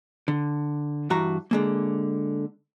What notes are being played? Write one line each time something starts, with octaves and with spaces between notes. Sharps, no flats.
D3
G2 E3 F#4 A#5
D3 G#3 A#3